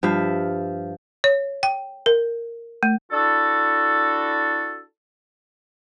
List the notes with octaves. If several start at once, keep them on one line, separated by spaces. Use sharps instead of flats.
G2 F3 E5 F5
C#5
G5
A#4
A3
D4 E4 F#4 A4